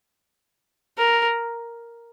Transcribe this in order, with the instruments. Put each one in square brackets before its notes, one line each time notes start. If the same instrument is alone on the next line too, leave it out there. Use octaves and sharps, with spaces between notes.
[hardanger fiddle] A#4